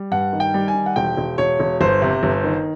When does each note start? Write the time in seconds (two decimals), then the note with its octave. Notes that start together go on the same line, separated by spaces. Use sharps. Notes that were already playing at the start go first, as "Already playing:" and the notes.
Already playing: G3
0.11 G2 F#5
0.33 D#3
0.40 G5
0.54 G3
0.68 G#5
0.75 D#3
0.86 F#5
0.96 E1 G5
1.17 E1
1.38 E1 C#5
1.60 E1
1.81 G1 C5
2.02 C3
2.23 G1
2.44 D#3